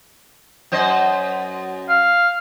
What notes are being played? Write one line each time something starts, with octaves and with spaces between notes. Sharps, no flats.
F#2 C5 D#5
F5